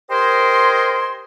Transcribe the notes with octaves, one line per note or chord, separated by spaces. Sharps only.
G4 A#4 C5 D#5 G#5 C6